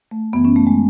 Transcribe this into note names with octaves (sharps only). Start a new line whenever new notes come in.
A3
F#2 C#3 E3 B3
C#4
A3
G#3